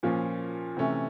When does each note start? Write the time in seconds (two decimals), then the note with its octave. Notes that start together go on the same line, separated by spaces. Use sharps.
0.03 A#2 F3 A#3 C#4 F4
0.77 C3 E3 A3 C#4